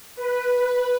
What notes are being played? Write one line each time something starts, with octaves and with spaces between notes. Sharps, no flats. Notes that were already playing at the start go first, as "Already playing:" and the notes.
B4